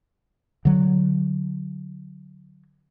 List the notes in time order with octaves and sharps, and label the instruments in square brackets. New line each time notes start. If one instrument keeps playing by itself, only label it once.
[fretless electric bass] D3 F#3